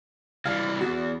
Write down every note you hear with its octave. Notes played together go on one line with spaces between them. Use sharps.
E3 G3 F5
E2 F#4